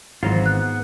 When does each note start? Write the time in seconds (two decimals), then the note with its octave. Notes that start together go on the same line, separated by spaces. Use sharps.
0.23 G#1 G#2 E3 F#3 F4 C7
0.46 B3 F#6